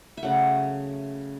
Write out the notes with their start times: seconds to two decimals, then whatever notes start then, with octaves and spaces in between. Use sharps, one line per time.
0.17 E5
0.23 C#3 F#3 A3 F#5